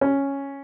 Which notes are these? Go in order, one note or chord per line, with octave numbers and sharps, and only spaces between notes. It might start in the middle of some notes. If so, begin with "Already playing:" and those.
C#4